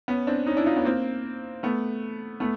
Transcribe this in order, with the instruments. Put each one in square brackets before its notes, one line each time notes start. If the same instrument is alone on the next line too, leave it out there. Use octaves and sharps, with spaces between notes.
[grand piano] B3 C#4
C4 D4
C#4 D#4
D4 E4
D#4 F4
B3 C#4
A#3 C4
A3 B3
A3 B3